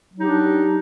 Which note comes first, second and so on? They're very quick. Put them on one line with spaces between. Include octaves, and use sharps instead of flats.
F#3 D#4 G4 D4